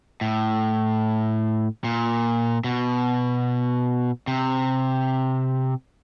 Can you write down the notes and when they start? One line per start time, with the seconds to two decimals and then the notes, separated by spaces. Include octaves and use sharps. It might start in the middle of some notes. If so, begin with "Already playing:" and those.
0.21 A2
1.84 A#2
2.64 B2
4.27 C3